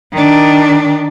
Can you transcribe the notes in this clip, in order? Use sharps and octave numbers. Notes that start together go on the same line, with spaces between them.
D#3 D4